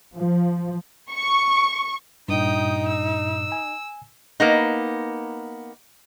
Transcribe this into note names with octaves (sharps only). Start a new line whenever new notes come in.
F3
C#6
G2 A#2 D#4 G5 D#6
E6
G#5
A#3 B3 D#4